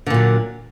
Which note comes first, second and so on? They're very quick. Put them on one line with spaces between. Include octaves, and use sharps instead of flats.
D3 A#2 F#3